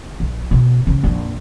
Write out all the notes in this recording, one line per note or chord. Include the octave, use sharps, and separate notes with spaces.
A#1
B2
C#3
A#1 F2